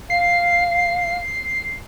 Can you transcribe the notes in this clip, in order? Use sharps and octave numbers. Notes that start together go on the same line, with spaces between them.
F5 C7